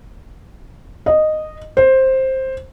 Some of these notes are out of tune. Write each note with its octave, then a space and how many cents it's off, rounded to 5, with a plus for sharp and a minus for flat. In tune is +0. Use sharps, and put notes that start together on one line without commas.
D#5 -10
C5 +10